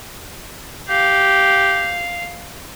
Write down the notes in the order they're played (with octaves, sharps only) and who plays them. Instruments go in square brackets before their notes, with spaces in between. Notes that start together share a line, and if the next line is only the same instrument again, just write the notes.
[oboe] G4 [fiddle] F5